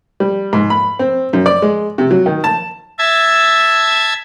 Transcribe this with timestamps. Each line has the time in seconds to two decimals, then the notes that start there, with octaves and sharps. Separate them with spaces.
0.20 G3
0.53 G#2
0.70 B5
0.99 C4
1.33 F#2
1.46 D5
1.62 G#3
1.98 C3
2.11 F#3
2.26 D#3
2.44 A5
2.99 E5 A5 G#6